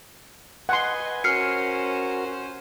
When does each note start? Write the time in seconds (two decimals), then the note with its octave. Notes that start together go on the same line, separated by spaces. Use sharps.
0.69 B4 D#5 F#5 G#5 C6
1.24 C#4 F#4 A#4 C5 F6 C7 C#7